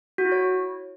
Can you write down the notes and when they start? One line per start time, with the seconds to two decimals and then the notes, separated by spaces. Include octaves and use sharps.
0.18 F#4
0.25 E4
0.32 C#5